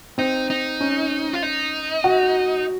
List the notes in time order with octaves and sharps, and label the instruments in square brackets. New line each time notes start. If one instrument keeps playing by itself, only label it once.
[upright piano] C4 [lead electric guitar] D#4
[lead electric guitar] D#4
[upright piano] C#4
[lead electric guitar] F4
D#4
[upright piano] F#4